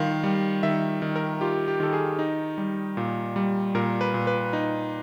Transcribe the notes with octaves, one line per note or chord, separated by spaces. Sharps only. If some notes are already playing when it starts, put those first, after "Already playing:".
Already playing: D#3 G3 F4 F5
G3
D#3 E5
D#3
A#4
F4 G4
G4
D#3 A4
G#4
D#4
G3
A#2
G3
A#2 A#4
B4
A#2
B4
D#4